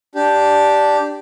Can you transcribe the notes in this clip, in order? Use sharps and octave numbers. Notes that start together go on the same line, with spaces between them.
D4 G4